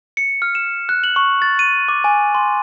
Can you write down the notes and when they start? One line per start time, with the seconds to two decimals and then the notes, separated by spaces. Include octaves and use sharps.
0.17 C#7
0.42 F6
0.55 E7
0.89 F#6
1.04 F#7
1.16 C#6
1.42 A6
1.59 D#7
1.88 D6
2.04 G#5
2.35 C6